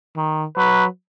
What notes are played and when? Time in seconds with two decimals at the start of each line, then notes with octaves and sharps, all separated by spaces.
0.17 D#3
0.57 F#3 B4